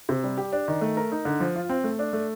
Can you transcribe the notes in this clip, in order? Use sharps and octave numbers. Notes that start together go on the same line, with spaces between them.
C3
G3
G4
D4
D#3
A3
A#4
D#4
D3
F3
F4
C4
A3
D4
A3